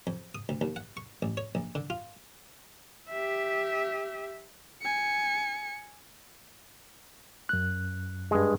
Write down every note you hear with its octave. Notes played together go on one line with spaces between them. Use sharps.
F2
D#6
D2
D#2
F#5
C#6
A1
C#5
A#1
D3
F4
G4 E5
G#5 C#7
F#2 F#6
G2 G#3